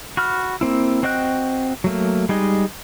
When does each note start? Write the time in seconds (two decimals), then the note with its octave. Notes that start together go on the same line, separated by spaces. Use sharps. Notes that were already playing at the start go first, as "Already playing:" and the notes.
0.17 F#4 B5 F6
0.61 A#3 C4 E4
1.03 C4 F#4 D#5 G5 F#6
1.84 F#3 A3 A#3
2.29 G3 G#3 D#4 G#4 D#5